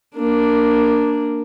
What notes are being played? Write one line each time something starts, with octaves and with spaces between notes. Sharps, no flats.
A#3 D4